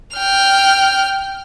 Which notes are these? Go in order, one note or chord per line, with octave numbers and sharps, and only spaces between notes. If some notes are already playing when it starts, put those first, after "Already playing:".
G5 F6